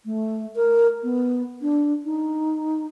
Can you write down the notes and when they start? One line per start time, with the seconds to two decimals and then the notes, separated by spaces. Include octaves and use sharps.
0.05 A3
0.56 A#4
1.03 B3
1.62 D4
2.05 D#4